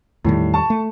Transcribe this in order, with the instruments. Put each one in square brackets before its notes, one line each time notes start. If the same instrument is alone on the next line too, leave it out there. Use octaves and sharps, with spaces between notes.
[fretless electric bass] E2 D#3 G3 [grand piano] A2
[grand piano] A5 C#6
[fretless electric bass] A3